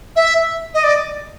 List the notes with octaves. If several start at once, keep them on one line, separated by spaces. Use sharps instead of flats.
E5
D#5
D5